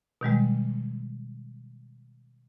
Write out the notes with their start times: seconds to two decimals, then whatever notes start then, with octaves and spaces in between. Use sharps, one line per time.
0.21 B2 D#3 G3 G#3